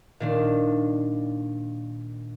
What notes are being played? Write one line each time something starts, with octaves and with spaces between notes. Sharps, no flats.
A#2 D#3 D4